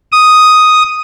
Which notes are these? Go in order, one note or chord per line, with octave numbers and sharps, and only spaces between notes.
D#6